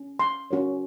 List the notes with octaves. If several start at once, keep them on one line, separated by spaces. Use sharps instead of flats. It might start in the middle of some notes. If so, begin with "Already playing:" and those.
Already playing: C#4
C6
C#4 F#4 A#4 C#5